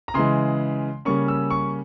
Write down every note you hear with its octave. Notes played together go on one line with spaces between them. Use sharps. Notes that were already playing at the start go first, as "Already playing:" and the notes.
A#5
C#3 E3 G#3 C6
C#3 G3 A#3 C#4 C#6
E6
C#6